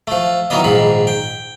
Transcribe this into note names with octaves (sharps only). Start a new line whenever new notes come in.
F3 A3
D#3 E3 F#3 A#3 B3 D#5
A#1 G#2 D#3 B5
G5